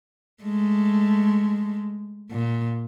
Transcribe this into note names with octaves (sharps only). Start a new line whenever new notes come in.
G#3 A3
A#2